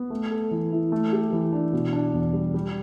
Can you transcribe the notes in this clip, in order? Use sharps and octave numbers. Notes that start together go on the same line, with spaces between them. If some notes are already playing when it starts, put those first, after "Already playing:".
Already playing: B3
A3
A4
E3
E4
A3
G4
E3
D4
B2
D4
E2
G3
G3